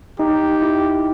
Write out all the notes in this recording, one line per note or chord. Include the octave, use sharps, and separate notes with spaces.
D#4 G4
E4